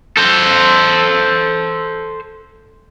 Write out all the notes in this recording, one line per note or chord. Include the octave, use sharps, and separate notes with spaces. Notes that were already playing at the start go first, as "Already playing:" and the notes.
A4 C5